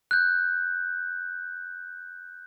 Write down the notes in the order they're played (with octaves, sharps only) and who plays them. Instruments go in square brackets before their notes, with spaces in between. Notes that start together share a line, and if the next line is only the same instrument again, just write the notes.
[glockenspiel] F#6 G6